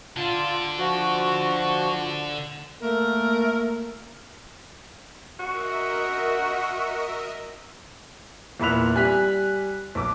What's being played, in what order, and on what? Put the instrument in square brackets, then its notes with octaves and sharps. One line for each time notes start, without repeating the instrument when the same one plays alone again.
[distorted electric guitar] D3 D4 [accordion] F4
[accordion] F3 F#4
[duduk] A3 [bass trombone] A#3 [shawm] A#4
[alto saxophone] F#4 [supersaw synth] A#4 D#5 E5
[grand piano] E2 A#2 E5 B5 F#6 F7
G3 G#5 F#6 B6
B1 D6